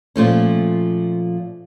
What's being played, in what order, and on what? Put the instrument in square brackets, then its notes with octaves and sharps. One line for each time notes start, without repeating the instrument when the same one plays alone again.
[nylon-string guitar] A#2 F3 A3 C#4